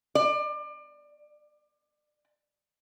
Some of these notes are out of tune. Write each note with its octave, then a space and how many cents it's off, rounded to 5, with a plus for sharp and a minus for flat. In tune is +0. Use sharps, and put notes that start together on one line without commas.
D5 +30